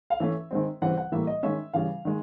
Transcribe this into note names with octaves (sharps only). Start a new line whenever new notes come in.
F5
E3 A3 C#4 E5
D#3 G#3 C4
C#3 E3 G3 C4 F#5
F#5
A2 E3 G3 A#3 E5
D#5
D#3 G#3 C#4 E5
C#3 E3 G3 F5
D#3 G#3